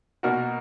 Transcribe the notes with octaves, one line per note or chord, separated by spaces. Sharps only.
B2 A#3 D#4 F#4 A#4